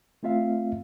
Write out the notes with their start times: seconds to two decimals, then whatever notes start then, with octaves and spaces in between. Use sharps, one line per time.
0.23 A3 C4 F4 E5 F5